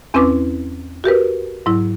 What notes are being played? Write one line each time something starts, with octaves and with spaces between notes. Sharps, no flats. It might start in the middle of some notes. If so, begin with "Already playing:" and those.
E2 C4 C#4 E4 B4 D6
F#4 G4 A#4 B4
G#2 F#3 E4